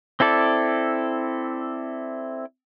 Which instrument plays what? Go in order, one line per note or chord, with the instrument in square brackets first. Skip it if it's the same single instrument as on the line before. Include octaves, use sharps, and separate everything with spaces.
[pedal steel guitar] C4 E4 A4 D5